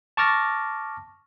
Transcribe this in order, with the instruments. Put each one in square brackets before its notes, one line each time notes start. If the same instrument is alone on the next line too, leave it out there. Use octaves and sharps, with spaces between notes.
[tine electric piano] A5 C#6 D6 F6 A6 A#6